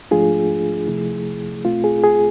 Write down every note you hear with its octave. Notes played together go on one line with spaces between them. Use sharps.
G#2 F3 A3 D4 F4 G#4
C3 F3 A3 E4
B2 A3 C4 F4
G#4
G#4